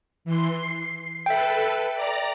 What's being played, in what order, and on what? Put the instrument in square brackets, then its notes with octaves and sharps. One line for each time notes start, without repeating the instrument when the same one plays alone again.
[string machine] E3 C6
C7
[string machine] A4 B4 [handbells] E5 G5
[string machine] D5 A#5